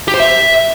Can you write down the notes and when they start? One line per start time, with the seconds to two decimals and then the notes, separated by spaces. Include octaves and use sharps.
0.08 G4
0.14 C5
0.20 E5